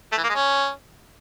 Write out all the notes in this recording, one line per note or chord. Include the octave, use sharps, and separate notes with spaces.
A3
E3
A#3
G#3
C#4